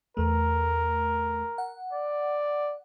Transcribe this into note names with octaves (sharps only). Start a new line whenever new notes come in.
E2 A3 A#4
F#5
D5